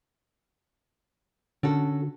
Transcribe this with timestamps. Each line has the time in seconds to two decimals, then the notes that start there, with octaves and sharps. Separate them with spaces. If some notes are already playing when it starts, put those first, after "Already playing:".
1.63 D3 C#4 F#4 A4